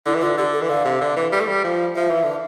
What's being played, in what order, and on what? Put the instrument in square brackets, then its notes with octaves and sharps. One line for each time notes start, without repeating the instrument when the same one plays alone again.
[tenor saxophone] D3 [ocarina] E4
[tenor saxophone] E3
[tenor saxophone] D3 [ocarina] F4
[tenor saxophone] D3 [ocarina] G4
[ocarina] A4
[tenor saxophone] E3
[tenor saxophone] D3 [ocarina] F5
[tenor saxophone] C3
D3
E3
G3
A3
G3
F3
[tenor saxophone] F3 [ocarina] E5
[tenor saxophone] E3
D3